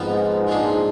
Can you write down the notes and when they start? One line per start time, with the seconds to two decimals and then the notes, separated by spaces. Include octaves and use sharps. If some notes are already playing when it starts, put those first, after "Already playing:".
Already playing: F2 G#2 F3 B3 F4
0.47 A#2 F3 G#3 D4